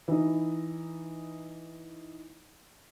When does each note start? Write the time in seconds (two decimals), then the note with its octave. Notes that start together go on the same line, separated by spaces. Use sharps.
0.08 E3 D#4